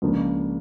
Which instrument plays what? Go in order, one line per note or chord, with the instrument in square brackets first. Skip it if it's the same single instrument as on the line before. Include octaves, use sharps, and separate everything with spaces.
[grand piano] C#2 C#3 F3 A#3 D4